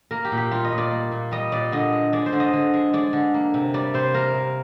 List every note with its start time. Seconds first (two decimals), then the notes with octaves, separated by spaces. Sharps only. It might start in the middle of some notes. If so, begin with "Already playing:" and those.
0.11 A#3 A#4
0.25 G4
0.32 A#2
0.37 G4
0.51 G3 F4
0.65 D#5
0.72 A#2
0.78 D5
0.91 A#3
1.12 A#2
1.31 G3 D#5
1.52 A#2 D5
1.72 D3 D#5
1.92 G#3
2.13 G#3 D5
2.26 C5
2.32 D3
2.40 D#5
2.53 D3
2.74 G#3
2.93 G#3 D5
3.13 D3
3.34 A#3
3.54 C3
3.74 G3 D5
3.94 C3 C5
4.14 A#3 A#4
4.34 C3